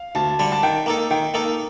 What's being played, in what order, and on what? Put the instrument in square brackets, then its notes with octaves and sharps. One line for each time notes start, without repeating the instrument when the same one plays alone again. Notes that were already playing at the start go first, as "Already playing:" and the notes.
Already playing: [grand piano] F5
[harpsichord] D2 [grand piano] A5
[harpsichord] D3 G3 D4
[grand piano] A5
[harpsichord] D#3 [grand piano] G5
[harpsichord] A#3 D#4 A4
[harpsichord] D#3 [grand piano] G5
[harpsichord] A#3 D#4 A4